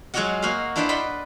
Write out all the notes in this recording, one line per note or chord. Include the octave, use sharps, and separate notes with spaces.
F#3 G#3 F4 F#4 D#5 F#5
A#3 F#4 D#5 F5
D4 E4 F4 B4 C5 D#5
B4 D5 D#5 F#5 B5 C6